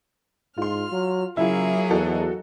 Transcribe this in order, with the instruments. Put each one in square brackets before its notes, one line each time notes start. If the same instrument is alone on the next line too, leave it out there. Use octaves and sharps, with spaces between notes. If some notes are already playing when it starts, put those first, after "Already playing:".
[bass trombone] G#2 [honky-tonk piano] F4 C6 [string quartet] F6
[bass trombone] F#3
[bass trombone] C#3 [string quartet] F#3 A#3 G#4 [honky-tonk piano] E4 F4
[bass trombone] E2 [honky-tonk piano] D#4 F#4 A4